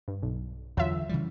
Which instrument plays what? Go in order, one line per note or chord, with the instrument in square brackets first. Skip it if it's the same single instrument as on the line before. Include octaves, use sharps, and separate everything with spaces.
[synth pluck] G2
B1
[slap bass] E2 D3 [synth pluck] F#3 F4 E5
[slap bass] C#3 E3 G3